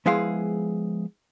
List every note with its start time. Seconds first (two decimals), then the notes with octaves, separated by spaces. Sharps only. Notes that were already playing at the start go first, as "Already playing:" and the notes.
0.06 F3 G#3 B3 E4 G#4 F5